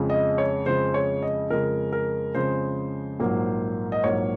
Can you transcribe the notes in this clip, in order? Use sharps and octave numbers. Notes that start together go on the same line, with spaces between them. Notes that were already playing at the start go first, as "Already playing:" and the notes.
Already playing: F2 C#3 G#3
D#5
C#5
F2 C#3 G#3 C5
C#5
D#5
F2 C#3 G#3 A#4
A#4
F2 C#3 G#3 C5
A#1 G#2 F#3 A#3
D#5
A#1 G#2 F#3 A#3 C#5